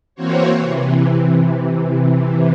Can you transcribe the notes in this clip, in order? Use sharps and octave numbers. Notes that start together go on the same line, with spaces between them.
E3 A#3 C4 F#4 C5 C#5
C3 E3